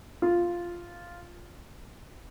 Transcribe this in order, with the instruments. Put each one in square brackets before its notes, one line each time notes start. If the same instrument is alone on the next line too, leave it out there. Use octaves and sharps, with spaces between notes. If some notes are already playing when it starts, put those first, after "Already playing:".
[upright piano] F4